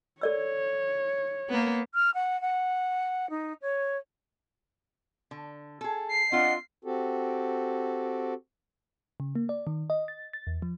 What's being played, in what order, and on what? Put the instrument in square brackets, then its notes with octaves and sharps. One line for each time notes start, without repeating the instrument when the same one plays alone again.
[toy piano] A4 D5 E6 [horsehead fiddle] C#5
[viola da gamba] A#3 B3
[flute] F6
F#5
F#5
D#4
C#5
[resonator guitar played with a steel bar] D3
G#4 A4
[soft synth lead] C7
[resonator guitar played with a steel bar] C4 F4 [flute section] D4 D#5 F#5
[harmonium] C4 F#4 G4 A4
[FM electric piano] C#3
A#3
D5
D#3
D#5
A6
A6
E2
F3